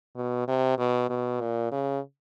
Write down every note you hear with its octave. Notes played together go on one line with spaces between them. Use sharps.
B2
C3
B2
B2
A#2
C#3